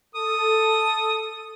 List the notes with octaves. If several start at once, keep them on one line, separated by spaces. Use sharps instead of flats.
A4 D#6